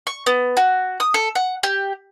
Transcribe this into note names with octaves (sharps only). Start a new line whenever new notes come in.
C#6
B3
F#4
D#6
A4
F#5
G4